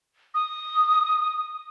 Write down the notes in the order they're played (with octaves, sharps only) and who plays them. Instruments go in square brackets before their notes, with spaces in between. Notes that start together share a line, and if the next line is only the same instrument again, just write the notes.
[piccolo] D#6